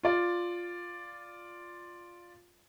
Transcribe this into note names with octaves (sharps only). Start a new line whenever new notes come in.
F4 D5